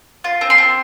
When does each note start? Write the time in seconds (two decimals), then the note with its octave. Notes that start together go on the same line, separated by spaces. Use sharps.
0.24 F4
0.41 C4
0.50 C6
0.58 C4